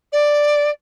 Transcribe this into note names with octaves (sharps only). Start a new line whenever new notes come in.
D5